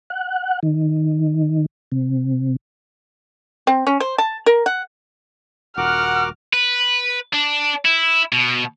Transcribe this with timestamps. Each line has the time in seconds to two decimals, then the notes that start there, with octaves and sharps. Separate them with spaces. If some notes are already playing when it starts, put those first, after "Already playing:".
0.10 F#5
0.63 D#3
1.92 C3
3.67 C4
3.87 C#4
4.00 C5
4.18 A5
4.46 A#4
4.66 F#5
5.78 D#1 F#4 A#4 F#5 D6 F6
6.53 B4
7.33 D4
7.85 E4
8.33 B2